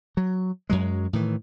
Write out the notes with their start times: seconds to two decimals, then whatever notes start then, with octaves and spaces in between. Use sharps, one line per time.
0.17 F#3
0.70 F#2 F#3 G#3
1.13 A2 D#3 E3